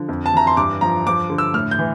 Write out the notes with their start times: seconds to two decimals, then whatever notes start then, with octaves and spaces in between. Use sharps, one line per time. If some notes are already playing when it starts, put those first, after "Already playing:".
Already playing: D3 F3
0.09 F2
0.26 A5
0.34 E3 A#5
0.47 C6
0.57 G2 D6
0.81 F3 A#5
1.07 F3 D6
1.30 D3
1.38 E6
1.54 A2 F6
1.71 G6
1.79 E3